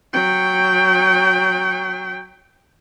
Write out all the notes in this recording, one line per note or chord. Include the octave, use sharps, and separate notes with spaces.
F#3 G5